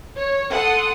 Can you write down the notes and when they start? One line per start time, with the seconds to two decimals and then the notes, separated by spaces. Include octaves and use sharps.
0.15 C#5
0.52 A4 F#5 C6 D#6